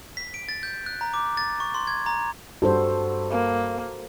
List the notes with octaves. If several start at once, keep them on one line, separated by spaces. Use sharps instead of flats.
B6
D7
A6
G6
F#6
A#5
D6
A6
C#6
C6
G#6
A#5
G2 F#4 A4 C5
A#3